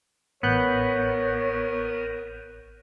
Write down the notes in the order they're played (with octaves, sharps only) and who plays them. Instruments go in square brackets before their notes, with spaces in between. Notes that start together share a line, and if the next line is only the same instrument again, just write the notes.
[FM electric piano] A1 F#6 G6 [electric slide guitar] B3 [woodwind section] A#4 [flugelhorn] C#5